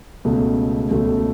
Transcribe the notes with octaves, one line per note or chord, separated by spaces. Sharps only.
C#2 B2 A3
C#2 B2 A3